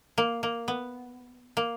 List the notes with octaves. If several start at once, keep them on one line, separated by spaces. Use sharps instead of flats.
A#3
A#3
B3
A#3